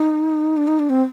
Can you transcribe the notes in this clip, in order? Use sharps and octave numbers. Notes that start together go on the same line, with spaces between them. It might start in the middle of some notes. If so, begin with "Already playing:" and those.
Already playing: D#4
D4
D#4
D4
C4